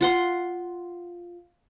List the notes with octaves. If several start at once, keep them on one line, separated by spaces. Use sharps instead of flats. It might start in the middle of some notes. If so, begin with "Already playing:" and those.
F4 F#5 C6